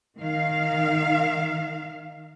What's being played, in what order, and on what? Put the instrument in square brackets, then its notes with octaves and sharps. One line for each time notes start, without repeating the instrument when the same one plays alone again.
[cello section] D#3 F5